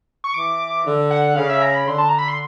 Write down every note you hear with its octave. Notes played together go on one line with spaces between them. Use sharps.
C#6
E3 D6
D3
F#5
C#3 F5
E5
A#5
B5
D3 C6
A5
A#5
B5
C6